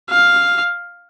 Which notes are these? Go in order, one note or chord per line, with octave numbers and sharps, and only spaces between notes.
F5